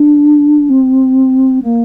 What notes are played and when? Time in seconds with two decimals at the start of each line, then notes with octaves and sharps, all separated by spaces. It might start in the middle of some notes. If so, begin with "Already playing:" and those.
Already playing: D4
0.69 C4
1.62 A#3